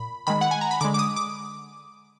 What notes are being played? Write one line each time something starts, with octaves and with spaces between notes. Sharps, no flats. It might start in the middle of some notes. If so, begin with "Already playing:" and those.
Already playing: A#2 B5
D#3 G#3 B5
F#5
G#5
A#5
B5
D3 G#3 D6
D6
D#6
D6